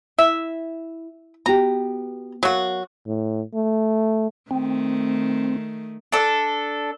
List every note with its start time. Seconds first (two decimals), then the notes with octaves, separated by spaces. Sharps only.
0.19 E4 E5
1.46 B3 F#4 G4 A#5
2.43 F#3 F#4 A#4 F5
3.07 A2
3.54 A3
4.51 D#3 A3 C4
6.12 D4 A4